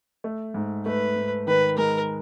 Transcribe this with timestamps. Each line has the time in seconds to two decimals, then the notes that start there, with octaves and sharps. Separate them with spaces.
0.24 A3
0.54 G#2
0.86 A3 B4
1.16 G#2
1.47 D#3 B4
1.77 G#3 A#4